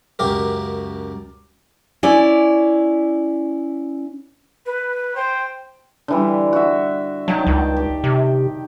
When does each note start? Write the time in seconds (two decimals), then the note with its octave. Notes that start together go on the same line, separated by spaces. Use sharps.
0.19 C#2 F#2 G4 A#4
2.03 C#4 E4 D5
4.66 B4
5.16 C5 G5
6.08 D3 E3 G3
6.53 F#4 E5
7.28 D#3 F#3 G5 A5
7.47 C#2
7.76 G4
8.04 C3